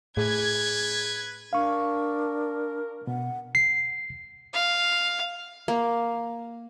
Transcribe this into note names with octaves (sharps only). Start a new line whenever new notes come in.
A2 G#4 B4 G#6
D4 A#4 F5 C#6
B2 F#5
C7
F5
A#3